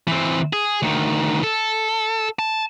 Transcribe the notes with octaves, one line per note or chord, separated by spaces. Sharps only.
E3 C4
G#4
D2 D#3
A4
A5